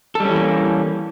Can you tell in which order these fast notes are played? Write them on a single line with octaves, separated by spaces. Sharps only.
A4 G3 C#4 E3 A#3